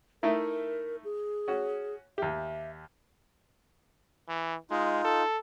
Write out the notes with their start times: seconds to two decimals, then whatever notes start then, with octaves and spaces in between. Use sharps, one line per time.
0.23 A3 D#4 E4 A#4
1.04 G#4
1.48 C#4 F#4
2.18 D#2 G4 E5
4.28 E3
4.71 G#3 D#4 F4
5.05 A4